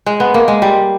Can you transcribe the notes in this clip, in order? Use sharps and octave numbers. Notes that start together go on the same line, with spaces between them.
G#3
B3
A#3
G#3
G3